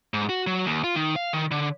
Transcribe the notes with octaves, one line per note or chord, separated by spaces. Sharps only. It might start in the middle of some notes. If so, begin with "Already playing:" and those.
G#2
F#4
F#3
D#2
F4
D#3
F5
D#3
D3